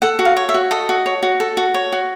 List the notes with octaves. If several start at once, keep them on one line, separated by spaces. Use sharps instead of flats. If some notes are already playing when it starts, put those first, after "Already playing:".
A4 F#5
F#4
F5
C#5
E5
F#4
A4 D#5
F#4
C#5
F#4
A4
F#4
C#5
F#4